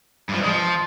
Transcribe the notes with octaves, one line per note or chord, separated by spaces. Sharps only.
G2
F3
G2
G#3
F3